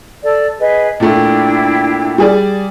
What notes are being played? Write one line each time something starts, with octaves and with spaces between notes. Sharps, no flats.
A4 D5
G#4 B4 D#5
A#2 A3 D4 E4 G5
G3 G#4 D5